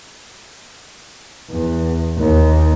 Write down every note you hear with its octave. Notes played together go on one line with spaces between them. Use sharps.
E2
D#2